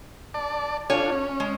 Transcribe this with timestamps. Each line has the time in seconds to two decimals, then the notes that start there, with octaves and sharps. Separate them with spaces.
0.34 D5 A5
0.90 D4 F4 A4 C#5 G#5
1.12 C#4
1.40 G#3